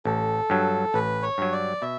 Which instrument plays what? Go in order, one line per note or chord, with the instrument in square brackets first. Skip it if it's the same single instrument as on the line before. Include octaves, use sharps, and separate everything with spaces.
[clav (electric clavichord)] A1 [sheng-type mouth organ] A4
[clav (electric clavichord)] G2 F#3
[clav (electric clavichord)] A1 [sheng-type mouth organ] B4
[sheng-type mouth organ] C#5
[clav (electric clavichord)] G2 F#3
[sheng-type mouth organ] D5
[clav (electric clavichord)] B2 [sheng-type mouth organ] E5